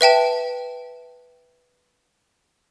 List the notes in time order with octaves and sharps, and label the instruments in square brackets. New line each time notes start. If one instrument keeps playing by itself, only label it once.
[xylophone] B4 E5 G5 A5